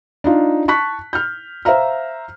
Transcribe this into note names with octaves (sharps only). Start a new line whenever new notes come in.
D4 D#4 F4
A5 C#6 F#6 B6
F6 G6
C5 E5 F5 A#5 F6